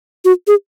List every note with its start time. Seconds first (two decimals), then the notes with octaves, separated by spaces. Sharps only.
0.25 F#4
0.48 G#4